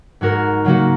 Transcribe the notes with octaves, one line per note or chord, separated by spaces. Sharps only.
G#2 G#3 F#4 A#4
C#3 F#3 A#3 F#4